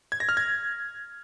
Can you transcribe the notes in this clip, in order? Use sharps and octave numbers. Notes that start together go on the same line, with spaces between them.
G#6
A#6
F6
G#6